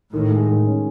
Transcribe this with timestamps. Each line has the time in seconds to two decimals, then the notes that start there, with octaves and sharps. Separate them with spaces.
0.13 A2 D#3
0.31 G#3
0.49 D#3
0.67 C#4